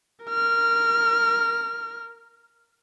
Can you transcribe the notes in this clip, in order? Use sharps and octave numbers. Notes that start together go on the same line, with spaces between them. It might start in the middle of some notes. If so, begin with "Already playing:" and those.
A#4 F6